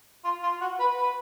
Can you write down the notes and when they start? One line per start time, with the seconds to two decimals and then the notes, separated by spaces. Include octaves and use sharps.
0.24 F4
0.43 F4
0.61 F#4
0.80 B4
0.98 B4